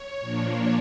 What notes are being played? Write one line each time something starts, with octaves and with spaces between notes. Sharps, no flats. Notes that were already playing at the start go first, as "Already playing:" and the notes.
Already playing: C#5
A#2 F3 A#3 D4